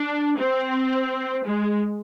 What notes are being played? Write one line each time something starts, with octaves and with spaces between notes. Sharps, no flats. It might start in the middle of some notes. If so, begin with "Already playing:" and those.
Already playing: D4
C4
G#3